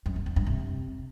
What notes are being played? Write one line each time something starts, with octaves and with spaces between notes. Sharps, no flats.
F#2
C3
E2
G2
C3